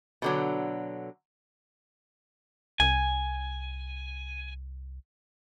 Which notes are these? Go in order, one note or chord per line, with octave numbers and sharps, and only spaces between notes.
B2 D3 F#3
C2 G#5